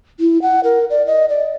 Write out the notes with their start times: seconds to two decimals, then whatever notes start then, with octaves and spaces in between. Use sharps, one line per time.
0.20 E4
0.42 F#5
0.64 A#4
0.90 D5
1.07 D#5
1.29 D5